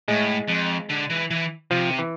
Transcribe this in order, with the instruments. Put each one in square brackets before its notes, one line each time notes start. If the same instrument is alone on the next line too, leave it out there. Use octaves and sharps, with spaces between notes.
[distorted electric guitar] A2 [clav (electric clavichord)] G#3
[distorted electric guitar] F2
D3
E3
E3
[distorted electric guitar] C3 [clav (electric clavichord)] F3
[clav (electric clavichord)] E3